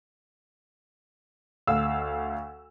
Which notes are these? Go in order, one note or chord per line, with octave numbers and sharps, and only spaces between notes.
D2 F5 E6